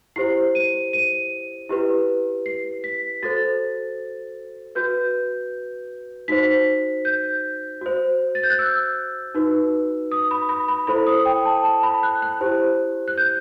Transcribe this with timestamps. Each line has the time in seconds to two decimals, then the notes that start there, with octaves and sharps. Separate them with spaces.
0.16 E4 G4 C5 C7
0.55 D#7
0.93 D#7
1.69 E4 G4 B4
2.46 C7
2.84 B6
3.23 F#4 A4 C5 A6
4.75 F#4 B4 G6
6.28 D#4 F#4 C5 B6
7.05 G6
7.81 F#4 C5
8.35 A6
8.43 G6
8.50 F#6
8.59 E6
9.34 D#4 F#4 B4
10.11 D#6
10.31 B5
10.49 B5
10.68 B5
10.87 E4 A4 C5 B5
11.06 D#6
11.26 G5
11.45 A5
11.64 A5
11.83 B5
12.03 F#6
12.22 F#6
12.41 E4 G4 C5
13.08 F#6
13.18 G6